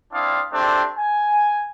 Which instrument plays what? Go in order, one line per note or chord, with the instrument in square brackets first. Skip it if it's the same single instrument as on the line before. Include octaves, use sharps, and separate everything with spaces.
[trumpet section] C4 D4 E4 F5 D#6
A3 C4 D4 G4
G#5